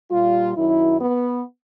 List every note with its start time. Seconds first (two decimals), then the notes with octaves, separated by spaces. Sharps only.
0.10 A#2 G3 F4
0.56 F#2 D#3 F#3 E4
1.01 B3